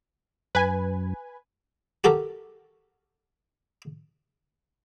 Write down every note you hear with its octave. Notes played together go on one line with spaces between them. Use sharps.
F#2 B4 G#5
F#4 G4 A4 A#4